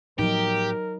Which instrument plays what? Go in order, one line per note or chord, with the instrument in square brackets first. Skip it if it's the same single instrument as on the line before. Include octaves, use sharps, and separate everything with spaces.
[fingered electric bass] A2 F3 B3 [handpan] F#3 D#4 [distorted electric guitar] G4 [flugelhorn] A#4